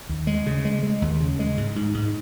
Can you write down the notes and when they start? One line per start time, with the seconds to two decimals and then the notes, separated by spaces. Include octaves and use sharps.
0.09 D#2
0.27 G#3
0.46 C#3
0.65 G#3
0.83 G#3
1.02 D#2
1.20 C#3
1.39 G#3
1.57 G#2
1.76 G#2
1.94 G#2